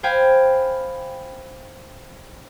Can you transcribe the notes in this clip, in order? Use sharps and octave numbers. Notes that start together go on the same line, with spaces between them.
C5 F5 G5 G#5 B5